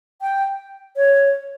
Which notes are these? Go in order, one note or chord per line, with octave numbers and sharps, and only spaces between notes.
G5
C#5